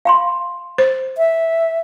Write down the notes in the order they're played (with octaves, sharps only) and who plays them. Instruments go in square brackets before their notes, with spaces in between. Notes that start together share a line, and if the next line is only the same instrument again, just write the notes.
[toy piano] F5 B5 C6
[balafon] C5
[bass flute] E5